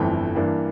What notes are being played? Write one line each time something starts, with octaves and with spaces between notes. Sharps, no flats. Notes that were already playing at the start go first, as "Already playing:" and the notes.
Already playing: G1 F2 E3 A3 G5
G2 E3 A#3 D4